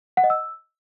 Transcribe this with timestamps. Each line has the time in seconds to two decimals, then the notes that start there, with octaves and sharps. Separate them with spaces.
0.17 F#5
0.24 D#5
0.30 E6